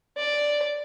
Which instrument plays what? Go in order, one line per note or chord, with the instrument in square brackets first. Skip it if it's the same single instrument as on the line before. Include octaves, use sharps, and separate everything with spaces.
[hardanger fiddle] D5